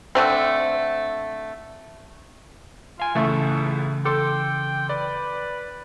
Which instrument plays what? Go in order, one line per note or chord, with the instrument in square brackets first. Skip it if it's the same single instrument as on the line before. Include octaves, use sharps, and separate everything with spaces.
[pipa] D3 A3 C4
[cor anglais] F4 [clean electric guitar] F5 G#5
[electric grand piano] C#2 A2 [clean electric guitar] C#3 E3 [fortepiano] A3 [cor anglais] A4
[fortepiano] A4 [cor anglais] G5 [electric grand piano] C6 D6
[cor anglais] B4 [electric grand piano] D5